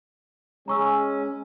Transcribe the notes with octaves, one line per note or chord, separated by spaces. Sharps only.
G#3 C#4 A#5 C#6 E6